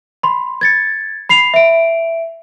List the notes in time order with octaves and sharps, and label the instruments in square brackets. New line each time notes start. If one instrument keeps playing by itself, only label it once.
[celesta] B5 C6
G#6 A6 C#7
B5 C7 F7
E5 D7